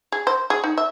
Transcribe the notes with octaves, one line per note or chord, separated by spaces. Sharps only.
G#4
C5
G#4
D#4
E5